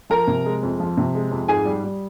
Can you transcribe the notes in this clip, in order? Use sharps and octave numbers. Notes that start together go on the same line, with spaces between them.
F3 A#4 A#5
C3
G#3
F2
F3
C3
G#3
F2
G#2 G#4 G#5
G3
G3